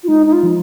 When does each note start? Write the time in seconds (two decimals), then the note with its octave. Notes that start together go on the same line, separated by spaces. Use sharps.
0.03 F4
0.07 G#3 D#4
0.26 D#4
0.32 F4
0.43 F3